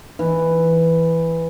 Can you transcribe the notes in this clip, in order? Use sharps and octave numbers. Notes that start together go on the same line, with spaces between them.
E3